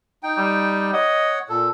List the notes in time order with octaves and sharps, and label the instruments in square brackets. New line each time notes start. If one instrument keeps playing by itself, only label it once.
[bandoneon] D#4 G5
[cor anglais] G3
[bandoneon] C#5 F#5 [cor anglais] D#5
[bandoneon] A#2 A4